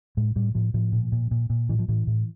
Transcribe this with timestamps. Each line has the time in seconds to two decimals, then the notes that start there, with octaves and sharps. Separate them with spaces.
0.17 A2 G#3
0.36 A2 G3
0.55 A2 F3
0.74 A2 F3
0.92 A#2
1.12 A#2
1.31 A#2
1.50 A#2
1.69 A2 E3
1.79 F3
1.88 A2 E3
2.07 A2